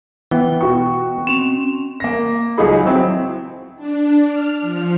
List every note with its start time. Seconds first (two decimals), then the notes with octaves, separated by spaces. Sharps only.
0.31 E3 B3 G5
0.61 B2 F#4 C#6
1.27 C4 C#4
2.00 A#3 A#6
2.58 C#2 F#3 D#4 G#4 B5
2.86 F#3 C4 E4
3.76 D4
4.28 F6
4.61 F3